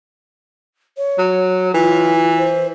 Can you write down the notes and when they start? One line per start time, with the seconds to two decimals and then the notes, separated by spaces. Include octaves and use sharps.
0.97 C#5
1.18 F#3
1.74 E3 F4
2.38 C5